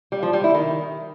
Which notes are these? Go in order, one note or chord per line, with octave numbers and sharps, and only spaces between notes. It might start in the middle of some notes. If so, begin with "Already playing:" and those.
G3
F3
G3
E4
D#3